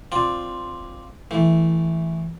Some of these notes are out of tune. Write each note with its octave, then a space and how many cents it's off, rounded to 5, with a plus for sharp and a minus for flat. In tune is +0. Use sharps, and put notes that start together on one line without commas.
C4 +0 F4 +0 D5 +0
E3 +0 A3 +0